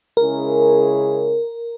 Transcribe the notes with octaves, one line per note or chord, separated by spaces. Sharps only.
C#3 G#3 C#4 E4 G#4 A#4